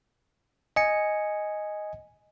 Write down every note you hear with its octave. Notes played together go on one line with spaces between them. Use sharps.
D#5 G#5 C#7